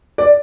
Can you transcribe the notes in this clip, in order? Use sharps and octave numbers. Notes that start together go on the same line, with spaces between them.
D5